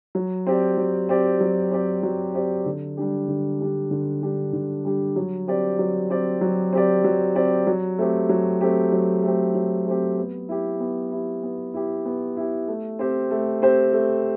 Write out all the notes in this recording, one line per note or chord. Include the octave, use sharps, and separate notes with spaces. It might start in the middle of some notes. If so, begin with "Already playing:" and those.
F#3
C4 G4 D5
F#3
C4 G4 D5
F#3
C4 G4 D5
F#3
C4 G4 D5
D3
G3 D4 G4
D3
G3 D4 G4
D3
G3 D4 G4
D3
G3 D4 G4
F#3
C4 G4 D5
F#3
C4 G4 D5
F#3
C4 G4 D5
F#3
C4 G4 D5
F#3
A3 C4 G4
F#3
A3 C4 G4
F#3
A3 C4 G4
F#3
A3 C4 G4
B3
E4 G4
B3
E4 G4
B3
E4 G4
B3
E4 G4
A3
C4 G4 C5
A3
C4 G4 C5
A3